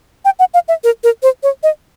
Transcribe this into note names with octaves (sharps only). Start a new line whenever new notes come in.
G5
F#5
F5
E5
A#4
A#4
C5
C#5
D#5